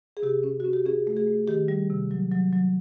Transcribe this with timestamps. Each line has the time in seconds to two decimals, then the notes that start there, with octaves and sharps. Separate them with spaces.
0.17 G#4
0.23 C3 G4
0.43 C#4
0.60 C#4 F#4
0.73 G4
0.86 C#4 G#4
1.07 A3
1.17 G#4
1.27 A3
1.48 D#3 G4
1.68 G3
1.90 C3
2.11 F#3
2.31 F#3
2.53 F#3